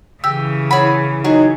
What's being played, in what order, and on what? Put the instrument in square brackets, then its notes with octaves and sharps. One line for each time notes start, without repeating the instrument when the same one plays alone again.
[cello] C#3 E3 [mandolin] G4 [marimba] E6
[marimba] E4 C#5 F#5 [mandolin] G#4 B5
[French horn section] D#3 F#3 D#4 [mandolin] G#4